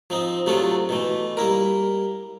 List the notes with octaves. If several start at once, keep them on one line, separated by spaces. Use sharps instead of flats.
F3 C4 D#4
C3 F#3 A3 D4 F4 A4
B2 E3 A3
G3 A#3 E4 A#4